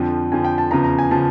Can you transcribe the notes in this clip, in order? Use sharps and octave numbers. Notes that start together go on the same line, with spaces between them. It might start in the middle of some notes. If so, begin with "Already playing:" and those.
Already playing: F2 D3 F3
F2 D3 F3 G#5
G5
A5
E2 C#3 F3 A#5
A#5
G#5
C#3 F3 A5